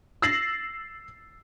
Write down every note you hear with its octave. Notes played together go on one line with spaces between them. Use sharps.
E6 A6 A#6 C7 F#7